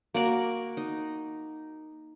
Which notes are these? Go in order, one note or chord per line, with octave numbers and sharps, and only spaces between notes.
A#3 F#4 D5
D#4